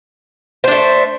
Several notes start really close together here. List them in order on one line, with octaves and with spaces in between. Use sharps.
C5 D4 A3